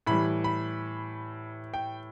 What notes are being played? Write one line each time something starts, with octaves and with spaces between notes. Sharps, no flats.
A2 E3 G3 B5
B5
G5